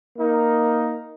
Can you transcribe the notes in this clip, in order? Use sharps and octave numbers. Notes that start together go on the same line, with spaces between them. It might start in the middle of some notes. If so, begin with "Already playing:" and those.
A#3 D#4 A#4